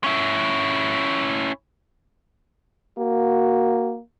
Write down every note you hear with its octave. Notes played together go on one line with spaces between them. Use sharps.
C#4 E4
A#3 F#4